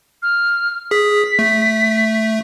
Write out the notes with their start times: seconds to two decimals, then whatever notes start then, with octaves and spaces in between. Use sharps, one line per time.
0.22 F6
0.91 G#4 B6
1.39 A3